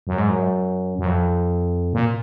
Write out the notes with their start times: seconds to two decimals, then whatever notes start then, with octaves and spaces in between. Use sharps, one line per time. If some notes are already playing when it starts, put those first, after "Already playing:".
0.07 F#2
0.18 G#2
0.29 F#2
0.99 F#2
1.06 F2
1.93 A#2